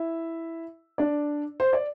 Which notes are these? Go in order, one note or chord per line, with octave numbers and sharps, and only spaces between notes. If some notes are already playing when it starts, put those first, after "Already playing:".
Already playing: E4 E5
D4 D5
C5
D5